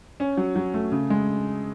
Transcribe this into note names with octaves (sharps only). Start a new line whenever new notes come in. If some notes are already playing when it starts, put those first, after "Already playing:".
C#4
F#3
F#3
A3
C#3
G#3